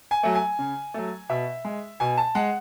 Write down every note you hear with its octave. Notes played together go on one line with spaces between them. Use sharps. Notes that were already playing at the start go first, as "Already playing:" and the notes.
G#5
F#3 A3
G#5
C#3
F#3 A3
B2 E5
G#3
B2 G#5
A5
G#3 F#5